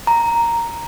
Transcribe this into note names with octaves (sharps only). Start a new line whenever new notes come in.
A#5